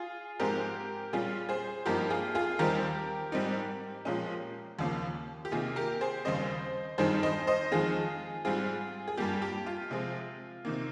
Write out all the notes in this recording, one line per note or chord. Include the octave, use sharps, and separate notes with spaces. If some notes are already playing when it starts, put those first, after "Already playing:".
Already playing: F4 G#4
G#2 F3 G#3 C4 G4 A#4
A#2 G3 C#4 F4 G#4
G#4 C5
G2 F3 A#3 D#4 G4 A#4
F4 G#4
F4 G#4
D#2 D#3 G3 C4 D#4 G4 A#4
G#2 G3 C4 D#4
A#2 F3 G#3 C#4
D#2 C#3 F3 A#3
G4
C3 D#3 A#3 D#4 F4 G#4
G4 A#4
G#4 C5
D#2 C#3 G3 C4 C5 D#5
G2 D#3 G3 C4 D#4 G#4 C5
C5 D#5
C5 D#5
F2 D#3 G#3 F4 G#4
G#2 G3 C4 F4 G#4
G#4
G2 G3 A#3 G4
G4
F4
C3 F3 G#3 C4
C3 D#3 A#3